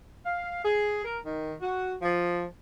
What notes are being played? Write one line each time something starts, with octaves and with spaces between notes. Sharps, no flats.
F5
G#4
A#4
D#3
F#4
F3